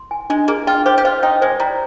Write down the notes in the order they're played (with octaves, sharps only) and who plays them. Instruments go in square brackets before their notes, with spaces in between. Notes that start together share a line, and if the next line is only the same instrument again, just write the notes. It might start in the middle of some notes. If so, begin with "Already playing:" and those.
Already playing: [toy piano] C6
G#5
[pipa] G#3 [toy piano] D4
[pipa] A#3 [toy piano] G#4
[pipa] F4 [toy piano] G5
[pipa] G4 [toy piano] C5
[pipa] G4
[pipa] F4 [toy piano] C5
[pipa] D#4 [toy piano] G5
[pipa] G#3 [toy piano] C5
[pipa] G3 [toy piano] A#5